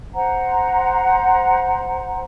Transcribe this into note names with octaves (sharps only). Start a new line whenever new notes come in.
C5 F#5 A#5